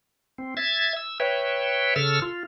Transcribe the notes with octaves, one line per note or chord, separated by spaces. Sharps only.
C4
E5 G#6 A6
E6
B4 C#5 E5 G5
C#3 A4 E6 F6
F4